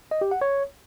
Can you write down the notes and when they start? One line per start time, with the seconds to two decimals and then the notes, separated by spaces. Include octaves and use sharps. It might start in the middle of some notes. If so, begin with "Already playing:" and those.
0.11 D#5
0.21 G4
0.31 F#5
0.41 C#5